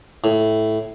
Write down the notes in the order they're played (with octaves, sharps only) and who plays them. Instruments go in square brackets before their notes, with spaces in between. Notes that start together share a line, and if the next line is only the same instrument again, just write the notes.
[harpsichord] A2